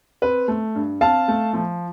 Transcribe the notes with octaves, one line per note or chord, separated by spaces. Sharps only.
C4 B4
A3
G2
C4 F5 A5
A3
F3